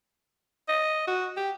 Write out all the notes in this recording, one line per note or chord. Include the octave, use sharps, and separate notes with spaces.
D#5
F#4
G4